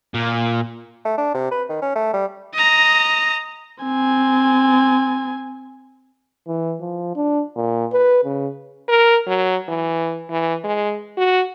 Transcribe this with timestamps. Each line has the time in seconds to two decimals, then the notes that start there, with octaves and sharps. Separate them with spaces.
0.14 A#2
1.05 A3
1.18 D4
1.34 C3
1.52 B4
1.69 D#3
1.82 C#4
1.96 A3
2.13 G3
2.54 D#5 A#5
3.83 C4 G#5
6.47 E3
6.81 F3
7.16 D4
7.56 A#2
7.92 B4
8.24 C#3
8.88 A#4
9.27 F#3
9.69 E3
10.30 E3
10.64 G#3
11.17 F#4